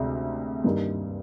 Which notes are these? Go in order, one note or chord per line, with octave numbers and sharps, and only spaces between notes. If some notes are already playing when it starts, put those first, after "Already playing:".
Already playing: D2 C3 G#3 C4
G2 D#3 A#3 D#4 G4